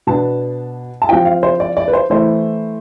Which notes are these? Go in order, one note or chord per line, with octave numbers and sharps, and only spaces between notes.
B2 B3 D4 A5
A5
F3 C4 F4 G5
F5
C5
D5
D5
B4
C5
E3 A3 E4 C5